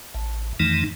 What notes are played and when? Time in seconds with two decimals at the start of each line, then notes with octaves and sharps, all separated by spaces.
0.14 A1
0.60 F2 D#3 E3 A3 D#4